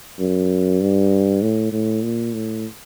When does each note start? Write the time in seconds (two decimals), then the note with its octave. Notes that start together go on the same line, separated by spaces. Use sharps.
0.19 F#2
0.81 G2
1.42 A2
1.72 A2
2.03 A#2
2.34 A2